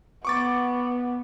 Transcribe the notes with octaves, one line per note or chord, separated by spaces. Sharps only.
B3 C#6 D6 A6